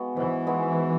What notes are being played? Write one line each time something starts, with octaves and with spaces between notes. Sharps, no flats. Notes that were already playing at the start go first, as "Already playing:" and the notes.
Already playing: G#3 B3 F#4
G#2 E3
G#3 B3 F#4